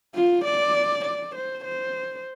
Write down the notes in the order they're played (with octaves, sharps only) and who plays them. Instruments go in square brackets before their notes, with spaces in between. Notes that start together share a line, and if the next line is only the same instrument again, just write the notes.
[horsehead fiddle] F4
D5
D5
C5
C5